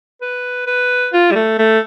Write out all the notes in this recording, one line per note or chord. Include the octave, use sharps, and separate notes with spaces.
B4
B4
F4
G3
A3
A3